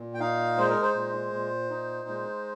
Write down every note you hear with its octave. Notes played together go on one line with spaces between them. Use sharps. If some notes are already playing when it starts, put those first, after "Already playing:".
Already playing: A#2
G5
D#4 F5
G#3 C5
A#4
C5
A#2
A#2
D#4
G#3